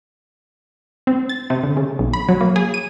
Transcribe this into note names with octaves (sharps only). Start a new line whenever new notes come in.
C4
A6
C3
D3
C#3
B1
B5
F#3
A#3
G#4
D#7